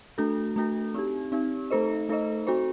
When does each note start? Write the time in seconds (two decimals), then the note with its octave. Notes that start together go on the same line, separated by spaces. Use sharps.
0.18 A3 D4 F#4 A4
0.56 A3 D4 F#4 A4
0.94 C4 D#4 G4
1.32 C4 D#4 G4
1.70 A3 D#4 A4 C5 D#5
2.09 A3 D#4 A4 C5 D#5
2.47 C4 F#4 A4 C5